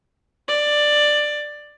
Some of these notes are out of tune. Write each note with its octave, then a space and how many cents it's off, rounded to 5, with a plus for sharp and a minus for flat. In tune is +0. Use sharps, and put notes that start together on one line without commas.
D5 +10